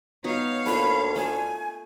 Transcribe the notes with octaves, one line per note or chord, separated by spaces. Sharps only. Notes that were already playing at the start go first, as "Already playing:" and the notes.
B3 D#4 F#4 C#5 F5
D2 A#3 F4 B5
A3 G#5